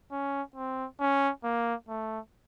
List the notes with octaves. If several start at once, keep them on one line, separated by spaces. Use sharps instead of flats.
C#4
C4
C#4
A#3
A3